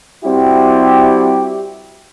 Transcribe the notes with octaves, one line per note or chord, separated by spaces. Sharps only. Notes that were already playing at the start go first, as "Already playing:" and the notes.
G3 C4 E4 F#4 G4